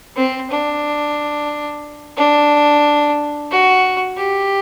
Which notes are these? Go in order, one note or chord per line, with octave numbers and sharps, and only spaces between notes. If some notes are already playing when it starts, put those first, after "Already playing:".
C4
D4
D4
F#4
G4